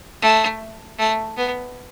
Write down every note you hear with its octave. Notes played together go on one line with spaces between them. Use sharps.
A3
A3
B3